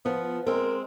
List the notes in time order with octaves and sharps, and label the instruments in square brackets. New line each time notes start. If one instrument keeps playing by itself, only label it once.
[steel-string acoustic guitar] F3 [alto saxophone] B3
[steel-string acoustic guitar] G#3 C4 [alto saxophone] A#4